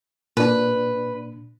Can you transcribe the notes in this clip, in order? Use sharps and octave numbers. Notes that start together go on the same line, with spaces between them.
A#2 D4 B4